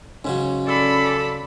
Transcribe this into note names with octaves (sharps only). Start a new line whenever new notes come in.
G#2 C#3 F#3 C#4
A4 D5 B5